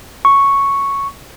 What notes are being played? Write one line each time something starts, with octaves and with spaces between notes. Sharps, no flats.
C#6